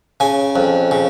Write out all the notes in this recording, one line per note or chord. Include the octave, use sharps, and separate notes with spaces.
C#3 G#5
F2
C#3